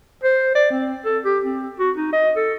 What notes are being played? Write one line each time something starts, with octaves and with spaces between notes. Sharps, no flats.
C5
D5
C4
A4
G4
C4
F#4
D#4
D#5
A4